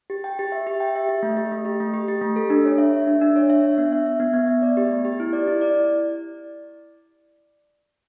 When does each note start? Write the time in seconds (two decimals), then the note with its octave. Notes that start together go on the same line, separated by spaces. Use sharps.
0.10 G4
0.24 G5
0.39 G4
0.52 E5
0.67 G4
0.80 G5
0.96 E5
1.09 G4
1.23 A3
1.37 G4
1.52 A3
1.65 G4
1.80 A3
1.94 G4
2.08 G4
2.22 A3
2.36 A4
2.50 D4
2.65 C#5
2.78 E5
2.93 E5
3.07 D4
3.21 D4
3.36 C#5
3.50 E5
3.63 D4
3.78 B3
3.93 E5
4.06 E5
4.20 B3
4.34 B3
4.48 E5
4.62 D5
4.77 G4
4.90 A3
5.05 G4
5.20 E4
5.33 D5
5.48 E4
5.61 D5